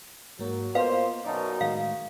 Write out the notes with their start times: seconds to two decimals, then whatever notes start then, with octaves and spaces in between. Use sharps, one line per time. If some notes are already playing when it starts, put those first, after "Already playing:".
0.39 G#2 F#3 A#3
0.75 A#3 B3 F4 B4 C5 D#5 F5
1.25 F#2 B2 D#4 D5 A5
1.61 A2 D#3 G#3 F5